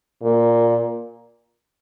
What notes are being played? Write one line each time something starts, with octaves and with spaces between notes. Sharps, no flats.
A#2